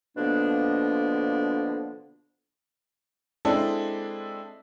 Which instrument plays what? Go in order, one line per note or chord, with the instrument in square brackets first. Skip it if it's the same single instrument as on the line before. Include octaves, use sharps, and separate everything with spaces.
[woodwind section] B2 D3 F3 A#3 B3 D4
[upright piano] G#3 C4 D4 E4 A4